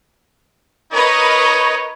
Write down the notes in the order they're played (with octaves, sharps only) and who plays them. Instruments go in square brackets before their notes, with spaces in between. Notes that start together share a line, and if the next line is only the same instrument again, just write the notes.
[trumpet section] D#4 C#5 [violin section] A#4 B4 D#5